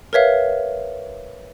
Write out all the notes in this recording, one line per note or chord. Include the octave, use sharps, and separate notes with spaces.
A#4 B4 C#5 E5 F5